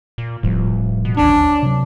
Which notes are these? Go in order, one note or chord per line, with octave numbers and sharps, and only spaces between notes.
A#2
D1 A2 F3 G3
B2
D#1 G#1 D2 C#4 D4
C3 F#3